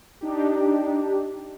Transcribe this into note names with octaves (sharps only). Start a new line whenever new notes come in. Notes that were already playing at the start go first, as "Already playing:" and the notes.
D4 D#4 G4